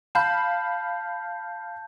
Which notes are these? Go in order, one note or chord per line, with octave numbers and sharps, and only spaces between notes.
F5 A5 B5 G6